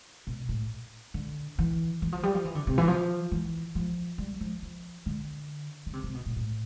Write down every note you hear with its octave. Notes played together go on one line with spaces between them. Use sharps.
B2
A2
D3
E3
E3
F3
G3
F3
E3
D3
C3
E3
F3
E3
F3
G3
F3
F3
D3
D3
C3
C3
B2
A2
A2